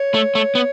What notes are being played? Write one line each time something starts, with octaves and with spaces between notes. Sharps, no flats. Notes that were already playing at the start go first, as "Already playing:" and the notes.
Already playing: C#5
A3
A3
B3